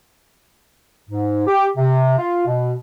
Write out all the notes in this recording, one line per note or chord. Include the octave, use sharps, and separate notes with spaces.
G#2
G4
C3
F4
B2